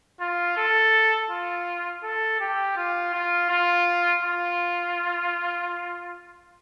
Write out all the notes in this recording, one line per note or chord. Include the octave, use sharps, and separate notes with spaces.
F4
A4
F4
A4
G4
F4
F4
F4
F4